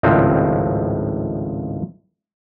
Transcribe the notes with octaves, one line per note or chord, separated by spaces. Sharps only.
G#1 C#2 A2 F3 C4 D#4